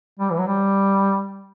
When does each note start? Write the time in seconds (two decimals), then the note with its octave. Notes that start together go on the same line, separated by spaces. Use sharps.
0.19 G3
0.31 E3
0.39 F#3
0.46 G3